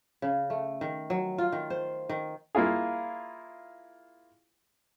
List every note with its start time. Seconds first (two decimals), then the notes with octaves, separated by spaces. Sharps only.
0.22 C#3
0.50 A3
0.81 D#3
1.10 F#3
1.38 F4
1.52 D#3
1.70 C5
2.09 D#3
2.55 A#3 E4 F4 G#4